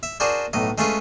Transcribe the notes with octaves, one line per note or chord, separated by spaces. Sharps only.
E5
D4 F#4 G#4 A#4 C5 D5
B1 A2 D#5
G#3 A3 C#4 F4 G#4 B4